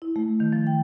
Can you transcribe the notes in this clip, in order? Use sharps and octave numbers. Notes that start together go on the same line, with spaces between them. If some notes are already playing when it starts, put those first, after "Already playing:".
E4
A3
D#3
F3
G5